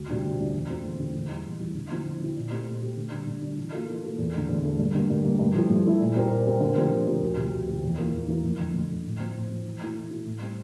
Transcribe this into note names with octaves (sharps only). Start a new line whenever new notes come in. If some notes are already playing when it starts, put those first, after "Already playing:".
Already playing: D2
C3 G3 D4 F4
D2
C3 G3 D4 F4
E2
D3 A3 C4 F4
E2
D3 A3 C4 F4
E2
E3 G3
E2
E3 G3
D3
F3 C4 E4
D3
F3 C4 E4
A#2
A3 C4 G4
A#2
A3 C4 G4
D3
G3 D4
D3
G3 D4
E3
A#3 F4 A4
E3
A#3 F4 A4
E2
D3 A3
E2
D3 A3
G2
D3 G3 A#3
G2
D3 G3 A#3
G2
F3 A3 E4 G4
G2
F3 A3 E4 G4
A#2
G3 C4 G4 A#4
A#2
G3 C4 G4 A#4
D3
F3 C4 G4 A#4
D3
F3 C4 G4 A#4
D2
C3 F3
D2
C3 F3
E2
E3 A#3 F4 A#4
E2
E3 A#3 F4 A#4
F2
D3 A3
F2
D3 A3
A2
F3 C4
A2
F3 C4
E3
A3 E4
E3
A3 E4
A2
G3 C4